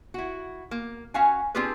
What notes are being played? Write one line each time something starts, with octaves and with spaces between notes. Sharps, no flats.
E4 F#4
A#3
C#4 F#4 F5 F#5 G#5
C4 D4 F4 G4 G#4 B4